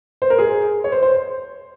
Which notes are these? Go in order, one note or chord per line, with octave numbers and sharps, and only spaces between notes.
C5
A#4
G#4
C#5
C5
C5